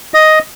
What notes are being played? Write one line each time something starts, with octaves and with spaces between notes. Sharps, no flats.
D#5